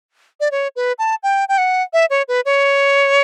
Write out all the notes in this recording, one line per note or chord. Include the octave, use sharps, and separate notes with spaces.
D5
C#5
B4
A5
G5
G5
F#5
E5
C#5
B4
C#5